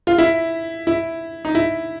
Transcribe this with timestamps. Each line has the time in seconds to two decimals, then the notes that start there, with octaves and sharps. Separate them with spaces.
0.07 F4
0.18 E4
0.87 E4
1.45 D#4
1.55 E4